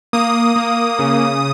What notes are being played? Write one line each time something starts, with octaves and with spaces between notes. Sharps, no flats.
A#3 D#6
A#3
C#3